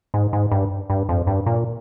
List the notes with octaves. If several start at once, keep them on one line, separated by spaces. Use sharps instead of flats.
G#2
G#2
G2
G2
F2
G2
A#2